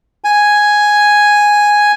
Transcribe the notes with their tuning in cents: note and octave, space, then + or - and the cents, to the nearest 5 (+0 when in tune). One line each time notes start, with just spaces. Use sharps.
G#5 +0